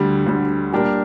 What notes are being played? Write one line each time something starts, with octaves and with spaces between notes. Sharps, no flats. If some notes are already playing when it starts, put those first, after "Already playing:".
Already playing: D2 D3 G3
D2 D3 G3
A#2 G3 D4 G4 A#4